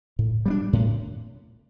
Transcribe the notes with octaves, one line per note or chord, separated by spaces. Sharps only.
A2
G3 A#3 D4
A2